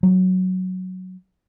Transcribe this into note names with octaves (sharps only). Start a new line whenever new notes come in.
F#3